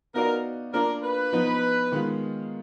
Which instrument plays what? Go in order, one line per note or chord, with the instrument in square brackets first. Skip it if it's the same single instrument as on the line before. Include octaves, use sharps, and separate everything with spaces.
[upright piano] B3 D#4 F#4 D5 F5 [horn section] A#4
[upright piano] A#3 D4 F4 [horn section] A#4
[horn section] B4
[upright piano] F3 B3 D#4
D#3 G#3 B3 F4